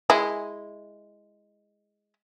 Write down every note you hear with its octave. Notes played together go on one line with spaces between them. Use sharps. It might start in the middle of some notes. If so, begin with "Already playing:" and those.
G#3 E4